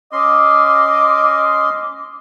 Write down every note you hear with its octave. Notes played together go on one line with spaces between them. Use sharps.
C#4 D#5 C6 D6